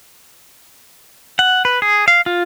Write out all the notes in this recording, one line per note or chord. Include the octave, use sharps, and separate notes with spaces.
F#5
B4
G#4
F5
F4